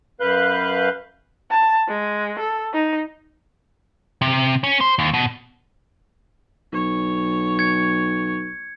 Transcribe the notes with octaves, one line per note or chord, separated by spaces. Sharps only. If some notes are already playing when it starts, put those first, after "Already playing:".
F#2 B4 F5 F#6 G6
A5
G#3
A4
D#4
C3
C#4
C5
D#2
B2
B1 C#5
G#6 C#7